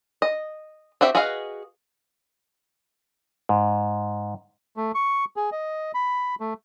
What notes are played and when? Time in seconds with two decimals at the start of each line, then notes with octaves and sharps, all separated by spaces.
0.22 D#5
1.01 C4 F#4 G4 E5
1.15 F#4 G#4 B4 D#5 F5
3.49 G#2
4.77 A3
4.95 C#6
5.36 G#4
5.52 D#5
5.94 B5
6.40 A3